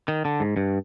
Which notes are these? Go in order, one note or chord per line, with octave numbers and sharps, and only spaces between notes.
D#3
D3
G#2
G2